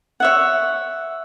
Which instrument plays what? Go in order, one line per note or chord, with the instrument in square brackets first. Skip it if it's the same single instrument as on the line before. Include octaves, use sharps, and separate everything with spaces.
[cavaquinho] C#5 E5 F#5